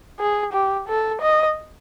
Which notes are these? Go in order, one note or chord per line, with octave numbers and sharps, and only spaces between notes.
G#4
G4
A4
D#5